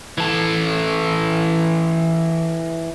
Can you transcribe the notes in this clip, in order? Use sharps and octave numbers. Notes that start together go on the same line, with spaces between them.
E3 A4